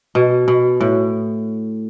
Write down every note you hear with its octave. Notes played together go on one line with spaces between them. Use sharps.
B2
B2
A2